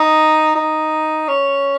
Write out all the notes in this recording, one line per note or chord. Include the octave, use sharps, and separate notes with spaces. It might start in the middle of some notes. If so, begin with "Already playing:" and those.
Already playing: D#4
D#4
C#4